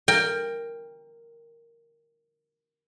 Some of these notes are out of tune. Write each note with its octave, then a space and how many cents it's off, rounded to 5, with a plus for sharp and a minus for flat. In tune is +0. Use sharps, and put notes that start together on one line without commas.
A#4 -5 G5 +20